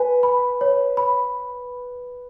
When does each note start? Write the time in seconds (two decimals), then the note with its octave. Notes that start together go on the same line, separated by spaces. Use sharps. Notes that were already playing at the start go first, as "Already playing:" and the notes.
Already playing: B4 G#5
0.23 B5
0.61 C#5
0.97 B5